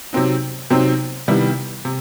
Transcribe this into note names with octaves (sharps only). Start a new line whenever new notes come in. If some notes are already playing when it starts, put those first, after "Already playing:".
C3 F#3 C4 D#4
C3 F#3 C4 D#4
C3 D#3 G3 B3 E4
C3